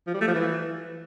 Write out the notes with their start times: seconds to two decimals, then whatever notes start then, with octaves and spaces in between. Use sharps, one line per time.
0.07 F3
0.14 G3
0.21 A3
0.28 F3
0.34 E3